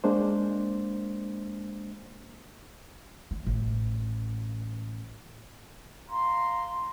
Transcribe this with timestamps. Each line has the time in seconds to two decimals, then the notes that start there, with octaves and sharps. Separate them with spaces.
0.04 G#3 A#3 D4 C5
3.31 A#3
3.46 A1
6.10 F5 A#5 C6